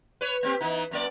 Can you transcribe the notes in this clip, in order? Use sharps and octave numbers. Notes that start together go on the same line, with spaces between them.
B4 C#5
A#3 C4 G4
E3 B3 D#4
F#2 A#3 D5